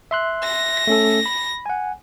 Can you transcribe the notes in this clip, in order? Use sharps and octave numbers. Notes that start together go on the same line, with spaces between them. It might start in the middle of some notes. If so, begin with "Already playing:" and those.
E5 C6 F#6
A#6
A3 C#4 A4
B5
F#5 G#5